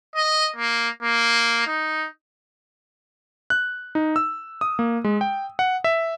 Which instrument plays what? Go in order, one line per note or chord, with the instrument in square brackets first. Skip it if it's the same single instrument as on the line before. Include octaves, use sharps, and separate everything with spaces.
[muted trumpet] D#5
A#3
A#3
D#4
[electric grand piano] F#6
D#4
E6
D#6
A#3
G#3
G5
F#5
E5